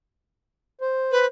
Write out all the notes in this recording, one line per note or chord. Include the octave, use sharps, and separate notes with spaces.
C5
B4